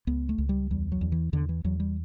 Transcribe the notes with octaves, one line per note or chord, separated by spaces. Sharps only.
C#2 B3
A3
C#2
G3
E2 G3
F#3
E2
E3
E2 D3
E3
E2 F#3
G3